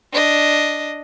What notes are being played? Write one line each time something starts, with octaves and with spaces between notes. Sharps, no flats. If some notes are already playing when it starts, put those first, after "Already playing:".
D4 D#5